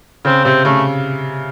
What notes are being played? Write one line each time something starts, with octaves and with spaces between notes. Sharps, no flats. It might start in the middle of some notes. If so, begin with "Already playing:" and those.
C#3 C4
C3 C4
C#3 A3